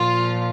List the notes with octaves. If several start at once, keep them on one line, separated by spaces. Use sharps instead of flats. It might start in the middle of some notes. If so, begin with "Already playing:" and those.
Already playing: A#2 F3 F4